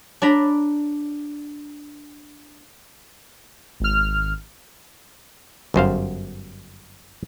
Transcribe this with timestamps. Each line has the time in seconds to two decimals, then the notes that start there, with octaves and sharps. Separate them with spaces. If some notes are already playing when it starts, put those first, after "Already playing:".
0.22 D4 D5 A#5 B5
3.80 G#1 F6
5.74 G1 F#2 C5 F5